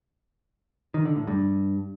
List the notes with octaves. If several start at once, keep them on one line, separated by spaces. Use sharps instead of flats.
D#3
D3
A2
G2